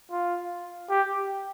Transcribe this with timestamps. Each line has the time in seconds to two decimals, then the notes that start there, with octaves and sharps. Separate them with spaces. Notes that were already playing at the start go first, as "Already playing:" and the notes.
0.11 F4
0.90 G4